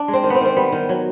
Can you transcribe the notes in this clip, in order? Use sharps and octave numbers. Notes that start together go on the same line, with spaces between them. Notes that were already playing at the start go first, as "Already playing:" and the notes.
Already playing: D4
G#3
C4
D#3
B3 C4
D#3 C4
G3 B3
D#3
F#3